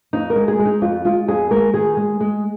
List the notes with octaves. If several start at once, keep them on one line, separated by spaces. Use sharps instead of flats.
F2 D#4
A#4
G#3
G#4
G#3
D#4
F2 F4
G#3 F4
F2 G#4
G#3 A#4
D#3 G#4
G#3 G#4
G#3